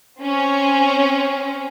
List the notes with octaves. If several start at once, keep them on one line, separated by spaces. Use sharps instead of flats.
C4 C#4